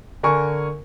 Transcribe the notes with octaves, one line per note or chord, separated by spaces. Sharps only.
D3 A#4 G#5 C#6